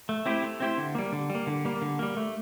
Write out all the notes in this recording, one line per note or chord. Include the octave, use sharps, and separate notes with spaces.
A3
C4 E4 G4 C5
A3
C4 E4 G4 C5
D3
G3 A#3
D3
G3
A#3
D3
G3 A#3
D3
G3 A#3
A3